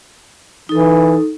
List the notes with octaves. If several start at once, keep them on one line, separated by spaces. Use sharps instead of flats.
E3 D#4 A4